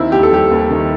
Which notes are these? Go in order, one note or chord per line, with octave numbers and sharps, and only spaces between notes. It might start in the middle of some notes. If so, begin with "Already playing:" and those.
Already playing: D#2 D#3 C4 E4
D#2 G4
A4
G3 G4
D#2
D#3